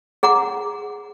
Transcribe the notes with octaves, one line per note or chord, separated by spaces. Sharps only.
G#4 F#5 A#5 D6